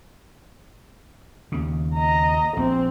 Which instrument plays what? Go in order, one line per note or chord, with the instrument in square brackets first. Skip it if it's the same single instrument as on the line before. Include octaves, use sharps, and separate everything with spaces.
[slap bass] D#2 C#3
[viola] D#5 A#5
[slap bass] A#1 [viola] C4